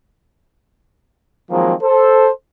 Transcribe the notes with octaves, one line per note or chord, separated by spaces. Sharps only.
D#3 F3 F#3 G#3 A#3 C4
A4 C5